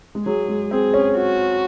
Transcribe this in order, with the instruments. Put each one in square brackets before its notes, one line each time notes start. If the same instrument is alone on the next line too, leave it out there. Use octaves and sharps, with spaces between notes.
[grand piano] G#3
[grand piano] F#3 [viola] G#4
[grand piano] G#3
[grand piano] C4 [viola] G#4
[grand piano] C#4
[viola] F#4